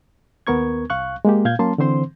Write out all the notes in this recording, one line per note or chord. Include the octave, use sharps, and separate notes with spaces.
D#2 B3 A#4 C#6 G#6
C2 F5 C#6 F#6
G#3 A#3 G4
A#2 F5 G6 G#6
F#3 A#3 C#4 A5 C6
D3 E3 C4 C5 C6